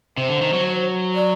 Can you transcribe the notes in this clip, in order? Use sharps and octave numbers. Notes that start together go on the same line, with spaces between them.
C3 C5
D3
D#3
F#3
D5